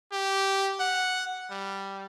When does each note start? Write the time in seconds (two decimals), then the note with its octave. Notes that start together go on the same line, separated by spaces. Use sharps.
0.12 G4
0.80 F#5
1.50 G3